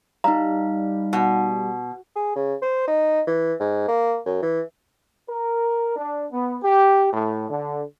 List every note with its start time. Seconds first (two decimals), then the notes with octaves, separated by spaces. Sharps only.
0.24 G3 D#4 F5 A#5
1.13 B2
2.16 G#4
2.36 C#3
2.62 C5
2.88 D#4
3.27 E3
3.60 G#2
3.88 A#3
4.26 F#2
4.42 E3
5.29 A#4
5.96 D4
6.31 B3
6.62 G4
7.12 A2
7.50 D3